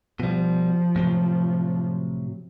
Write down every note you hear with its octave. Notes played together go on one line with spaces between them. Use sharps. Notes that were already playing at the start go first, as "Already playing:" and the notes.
B2 F3 G3
A2 C3 F#3